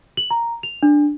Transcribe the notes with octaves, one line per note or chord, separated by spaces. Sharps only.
F#7
A#5
F7
D4